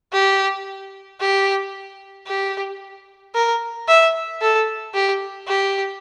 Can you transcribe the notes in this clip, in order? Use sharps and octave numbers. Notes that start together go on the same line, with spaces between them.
G4
G4
G4
A#4
E5
A4
G4
G4